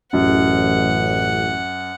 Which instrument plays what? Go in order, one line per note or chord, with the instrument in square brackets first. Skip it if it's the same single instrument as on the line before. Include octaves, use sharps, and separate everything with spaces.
[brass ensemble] A1 [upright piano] F#2 [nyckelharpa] F#5